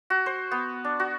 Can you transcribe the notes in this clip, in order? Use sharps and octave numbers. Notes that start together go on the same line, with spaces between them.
F#4
C5
B3
D4
F#4